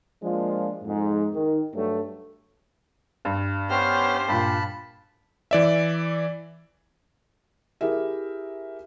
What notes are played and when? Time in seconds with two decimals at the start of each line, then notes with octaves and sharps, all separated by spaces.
0.23 F3 G#3 A#3 D4 F4
0.83 F2 G#2
1.35 D#3
1.74 G2 F#3 A3
3.25 G2
3.70 B3 C#4 G4 C5 F6
4.28 G2 A#2 A5 B5
5.51 E3 D5 E5
7.81 E4 G4 G#4 A#4 E5